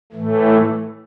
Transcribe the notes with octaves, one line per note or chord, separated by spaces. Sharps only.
A2 E3 A3